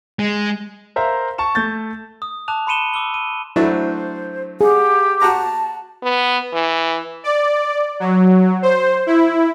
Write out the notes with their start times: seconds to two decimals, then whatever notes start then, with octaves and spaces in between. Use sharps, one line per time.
0.19 G#3
0.96 A#4 C5 E5 F5 A#5
1.38 A5 C#6 E7
1.55 A3 G6 A6
2.22 D#6
2.48 A5 D6 F#6 F7
2.67 B5 C6 C#7 D#7 E7 G7
2.93 D6 E6 G7
3.14 D#7
3.56 F#3 A3 D4 E4 C5
4.61 G4 G#4 F#5
5.22 F#4 F#5 A5 A#5
6.03 B3
6.54 E3
7.24 D5
8.00 F#3
8.62 C5
9.07 E4